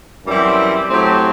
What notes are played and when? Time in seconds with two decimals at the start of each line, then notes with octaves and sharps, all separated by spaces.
0.26 F#2 E3 G3 C4 E4
0.90 A2 F#3 C4 G4